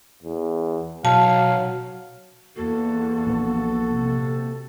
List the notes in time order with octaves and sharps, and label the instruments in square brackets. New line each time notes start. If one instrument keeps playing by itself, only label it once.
[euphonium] E2
[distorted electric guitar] B1 [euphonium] F#3 [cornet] F5 [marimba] A5
[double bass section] E2 [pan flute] A#3 [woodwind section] F#4 A4
[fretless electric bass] A#1 B3
[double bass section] C3